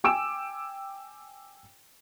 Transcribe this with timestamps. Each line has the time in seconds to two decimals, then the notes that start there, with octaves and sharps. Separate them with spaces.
0.04 G5 G#5 D6 E6 D7 E7